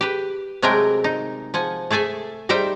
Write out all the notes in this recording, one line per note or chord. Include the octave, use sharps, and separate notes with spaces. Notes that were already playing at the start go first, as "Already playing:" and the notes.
G4 B4
C3 F#3 G#3 A3 A#4 G5
D#4
F3 F#5 G#5
A3 G#4 A4 E5 G#5
G3 D#4 C5 E5 G5